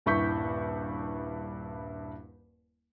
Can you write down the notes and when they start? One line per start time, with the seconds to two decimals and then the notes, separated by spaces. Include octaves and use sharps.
0.06 D#1 G2 E4 C#6 G6 B6